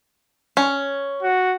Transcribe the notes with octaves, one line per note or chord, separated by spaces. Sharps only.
C#4
F#4